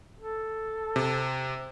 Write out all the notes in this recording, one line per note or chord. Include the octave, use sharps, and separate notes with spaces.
A4
C3